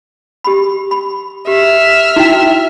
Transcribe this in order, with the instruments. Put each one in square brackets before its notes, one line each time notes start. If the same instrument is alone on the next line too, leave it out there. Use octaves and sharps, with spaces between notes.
[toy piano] G4 B5
B5
[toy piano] G4 [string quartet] E5 F6
[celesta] D#4 E4 [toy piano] F#4 G5